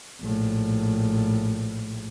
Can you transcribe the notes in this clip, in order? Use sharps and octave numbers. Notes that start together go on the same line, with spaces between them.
A#1 A2